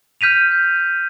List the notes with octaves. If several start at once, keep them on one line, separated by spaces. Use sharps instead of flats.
F6 G6 B6 D#7 F7